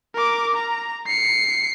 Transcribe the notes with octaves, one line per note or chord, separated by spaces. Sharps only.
A#4 D6
A#5
C7 C#7